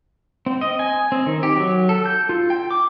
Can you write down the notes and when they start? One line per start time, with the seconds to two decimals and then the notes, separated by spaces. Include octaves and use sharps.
0.46 C4
0.61 D#5
0.79 G#5
1.12 C4
1.26 D#3
1.43 G4
1.57 F#3
1.89 A4
2.06 G6
2.29 F4
2.50 G5
2.71 D6